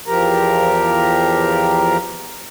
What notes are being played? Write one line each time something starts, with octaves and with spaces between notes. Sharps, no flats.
E2 F3 G4 A#4 A#5